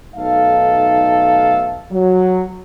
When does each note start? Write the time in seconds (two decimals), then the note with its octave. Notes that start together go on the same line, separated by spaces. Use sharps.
0.16 B1 A3 D#4 A4 F5
1.92 F#3